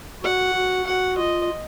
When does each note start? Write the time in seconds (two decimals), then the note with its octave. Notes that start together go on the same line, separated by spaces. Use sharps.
0.23 F#4 F#5
0.55 F#4
0.86 F#4 F#5
1.17 F4 D#5